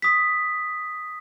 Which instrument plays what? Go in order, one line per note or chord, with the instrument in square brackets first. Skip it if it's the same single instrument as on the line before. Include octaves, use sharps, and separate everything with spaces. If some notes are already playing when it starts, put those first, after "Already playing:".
[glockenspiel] D#6 B6